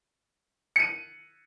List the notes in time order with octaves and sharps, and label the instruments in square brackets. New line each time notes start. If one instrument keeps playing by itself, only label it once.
[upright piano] C#7 D#7